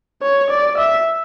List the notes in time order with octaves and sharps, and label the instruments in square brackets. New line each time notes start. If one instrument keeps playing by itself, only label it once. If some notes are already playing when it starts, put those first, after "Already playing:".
[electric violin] C#5
D5
E5